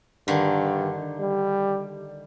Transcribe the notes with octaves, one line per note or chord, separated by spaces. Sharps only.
G2 D3 D#3
G3